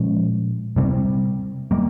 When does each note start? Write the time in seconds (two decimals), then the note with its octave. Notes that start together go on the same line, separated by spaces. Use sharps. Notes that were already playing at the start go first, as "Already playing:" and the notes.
Already playing: A#2 F3 G#3 C#4
0.76 C3 G3 C4
1.71 G3 A#3